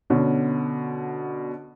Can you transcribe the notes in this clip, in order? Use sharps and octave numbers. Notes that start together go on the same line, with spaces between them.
B2 D3 C#4